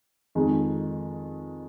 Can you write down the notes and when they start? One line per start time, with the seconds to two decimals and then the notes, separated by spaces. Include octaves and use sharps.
0.35 F2 D#3 G#3